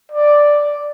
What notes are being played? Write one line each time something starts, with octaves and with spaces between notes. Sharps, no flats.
D5